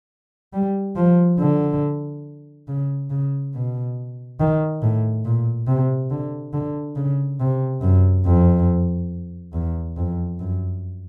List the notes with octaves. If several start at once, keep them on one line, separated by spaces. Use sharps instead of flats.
G3
F3
D3
C#3
C#3
B2
D#3
A2
A#2
C3
D3
D3
C#3
C3
F#2
F2
E2
F2
F#2